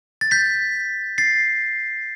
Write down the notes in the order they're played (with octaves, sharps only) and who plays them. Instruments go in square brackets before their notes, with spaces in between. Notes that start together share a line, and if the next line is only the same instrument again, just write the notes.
[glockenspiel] A6
G6 B6
A6 C7